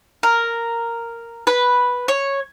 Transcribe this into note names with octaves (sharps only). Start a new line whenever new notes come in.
A#4
B4
C#5